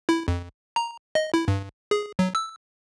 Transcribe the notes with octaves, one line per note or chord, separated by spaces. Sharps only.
E4
F2
A#5
D#5
E4
G2
G#4
F#3
E6